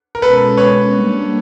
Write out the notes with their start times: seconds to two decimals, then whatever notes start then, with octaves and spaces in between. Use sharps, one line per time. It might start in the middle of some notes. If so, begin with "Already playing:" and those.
0.15 A#4
0.22 B2 G#3 C#4 F#4 A4 B4
0.57 B4 C#5
0.93 G3 A#3 D4 G4